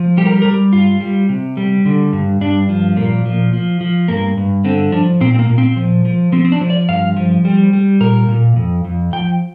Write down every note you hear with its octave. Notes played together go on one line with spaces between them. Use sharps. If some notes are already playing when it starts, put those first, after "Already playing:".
Already playing: F3
G3 G4
A#4
G4
G3 A#4
G4
G2 F4
G3
C3
G3
D3
G2
G2 D4
F3
A#2 A#3
F3
F3
F3
G2 A#3
G2
D3 C4
F3 D4
A#2 C4
C4
A#3
A#2
C4
F3
F3
F3 C4
C4
D4
F3
D5
G2 F5
F3
G3
G3
A#2 A#4
A#2
F2
F2
F3 G5